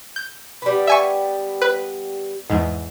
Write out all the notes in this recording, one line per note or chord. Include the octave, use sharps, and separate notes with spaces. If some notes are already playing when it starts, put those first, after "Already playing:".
G6
G3 B3
E5 G#5 C#6
B4
E2 G#2